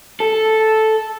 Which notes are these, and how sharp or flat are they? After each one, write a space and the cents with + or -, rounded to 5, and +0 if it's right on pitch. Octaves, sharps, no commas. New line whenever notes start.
A4 -5